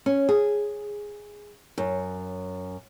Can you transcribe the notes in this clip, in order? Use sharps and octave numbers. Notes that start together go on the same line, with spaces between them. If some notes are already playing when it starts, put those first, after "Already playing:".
C#4
G#4
F#2